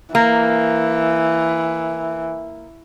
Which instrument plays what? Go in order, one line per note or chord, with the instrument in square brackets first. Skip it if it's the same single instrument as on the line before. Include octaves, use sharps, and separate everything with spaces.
[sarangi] E3 [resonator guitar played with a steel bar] A#3